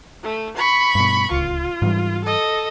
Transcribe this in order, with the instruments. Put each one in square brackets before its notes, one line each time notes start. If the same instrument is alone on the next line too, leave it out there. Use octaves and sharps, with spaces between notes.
[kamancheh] A3
B5 C#6
[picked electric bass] G2 B2
[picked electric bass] D1 C#2 [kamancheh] F4
[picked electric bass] G#2 E3 G3
[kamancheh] A4 D#5